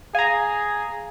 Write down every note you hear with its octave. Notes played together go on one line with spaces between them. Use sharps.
G#4 F5 G#5 A#5